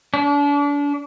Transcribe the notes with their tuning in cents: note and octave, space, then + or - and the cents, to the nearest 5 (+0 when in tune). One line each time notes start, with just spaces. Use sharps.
D4 -35